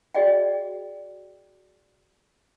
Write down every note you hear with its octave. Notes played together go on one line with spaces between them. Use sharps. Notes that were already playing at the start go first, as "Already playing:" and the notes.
F#4 G#4 D5 D#5 G5